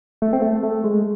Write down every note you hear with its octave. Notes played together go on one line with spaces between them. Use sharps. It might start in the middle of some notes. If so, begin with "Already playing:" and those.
A3
C4
A3
A3
G#3